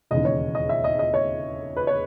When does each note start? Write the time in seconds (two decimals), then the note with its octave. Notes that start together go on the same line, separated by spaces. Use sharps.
0.11 E1 D#2 C#3 E3 D#5
0.25 C#5
0.55 D#5
0.69 E5
0.84 D#5
0.99 D#5
1.14 C#5
1.76 B4
1.87 C#5